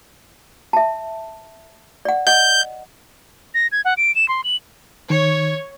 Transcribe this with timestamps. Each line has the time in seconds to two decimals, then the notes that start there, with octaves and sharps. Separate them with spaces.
0.73 E5 A5
2.05 D5 F#5
2.27 D#5 F#5 G6
3.54 A#6
3.72 G#6
3.85 F#5
3.97 D7
4.15 E7
4.28 C6
4.44 F#7
5.10 D#3 C#5